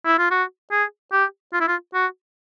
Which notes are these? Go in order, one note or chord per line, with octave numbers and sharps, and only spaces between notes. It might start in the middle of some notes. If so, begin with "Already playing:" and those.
E4
F4
F#4
G#4
G4
F4
E4
F4
F#4